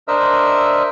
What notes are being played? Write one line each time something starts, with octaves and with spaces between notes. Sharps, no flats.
D4 A#4 C5 D#5 E5 E6